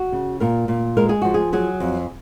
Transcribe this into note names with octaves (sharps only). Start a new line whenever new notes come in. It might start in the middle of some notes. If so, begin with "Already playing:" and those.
Already playing: F#4
C#3
A#2 A#4
A#2
G#3 A#4
G#4
F3 F#4
G#4
F#3 G#4
F2